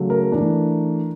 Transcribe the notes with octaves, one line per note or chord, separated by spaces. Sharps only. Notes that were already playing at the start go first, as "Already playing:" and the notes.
Already playing: C#3 F#3 A3
A#4
E3 A3 D4